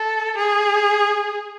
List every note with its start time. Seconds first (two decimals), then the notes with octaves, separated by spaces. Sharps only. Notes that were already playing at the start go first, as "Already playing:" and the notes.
Already playing: A4
0.37 G#4